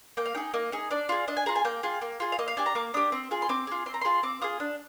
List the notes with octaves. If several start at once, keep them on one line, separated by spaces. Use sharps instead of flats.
A#3 G5
F5
D#4 G#4 G5
A#3 D#5
D#4 G#4
D4 D5
F4 G#4
D4 D#5
G#5
F4 G#4 A#5
G#5
A#3 G5
F4 G#4
A#3
F4 G#4
F5
A#3 D#5
F5
D4 G4 G#5
A#5
A#3 D6
D4 G4 D#6
C4
F4 G#4
C6
C4 D6
F4 G#4
C4 C6
A#5
F4 G#4 C6
C4 D6
F4 G#4 D#6
D4